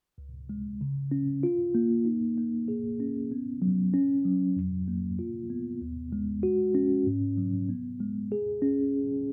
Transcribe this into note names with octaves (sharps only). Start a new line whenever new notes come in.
C#2
G#3
C#3
C#4
F4
A#3
D#4
A#3
G#4
C#4
B3
F#3
C#4
F#3
F2
A#3
F4
B3
D#2
G#3
F#4
C#4
G#2
F#3
B3
G#3
G#4
C#4